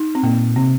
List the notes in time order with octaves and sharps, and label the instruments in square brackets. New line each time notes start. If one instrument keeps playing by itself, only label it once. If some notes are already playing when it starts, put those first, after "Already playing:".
Already playing: [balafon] D#4
C4
[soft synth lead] A#2 [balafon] A#3
[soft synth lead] C3 [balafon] C4